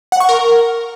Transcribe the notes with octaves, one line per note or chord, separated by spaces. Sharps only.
F#5
C#6
A#4